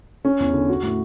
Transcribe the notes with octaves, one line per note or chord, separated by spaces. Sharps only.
C#4
E2
D3
F#4
A2